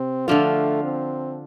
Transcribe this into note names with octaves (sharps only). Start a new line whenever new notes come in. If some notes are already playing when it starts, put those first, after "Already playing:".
Already playing: C3 C4
D3 F3 A3 D4 F4
C4